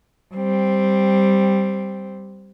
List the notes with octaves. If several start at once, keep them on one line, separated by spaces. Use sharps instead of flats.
G3 C4